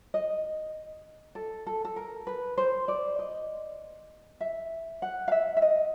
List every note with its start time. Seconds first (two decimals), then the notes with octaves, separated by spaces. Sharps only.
0.14 D#5
1.35 A4
1.67 A4
1.85 A4
1.96 A#4
2.27 B4
2.58 C5
2.88 D5
3.19 D#5
4.41 E5
5.02 F#5
5.28 F5
5.32 E5
5.57 E5
5.62 D#5